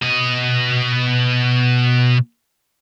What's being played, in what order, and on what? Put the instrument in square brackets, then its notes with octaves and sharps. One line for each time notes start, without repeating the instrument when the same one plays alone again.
[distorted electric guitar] B2 D#5